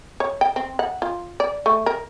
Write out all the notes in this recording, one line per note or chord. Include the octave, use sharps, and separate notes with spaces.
C#5
G5
C4
F#5
F4
D5
A3
A#4